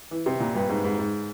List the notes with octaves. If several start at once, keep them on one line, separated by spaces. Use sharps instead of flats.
E3
C3
A#2
G2
G#2
G#2
G#2